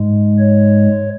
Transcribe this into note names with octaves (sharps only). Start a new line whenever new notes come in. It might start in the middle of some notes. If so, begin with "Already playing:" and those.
Already playing: G#2 G#3
C#5